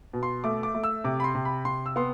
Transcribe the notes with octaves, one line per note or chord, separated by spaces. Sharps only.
B2
C6
A3 D6
D6
A3
E6
C3 D6
B5
C6
C3
B5
C3 C6
E6
B3 C6